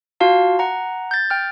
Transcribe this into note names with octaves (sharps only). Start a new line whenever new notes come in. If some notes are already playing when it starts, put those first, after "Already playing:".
F4 F#4 F5 A5
F#5 A#5
G6 A6
G5 F6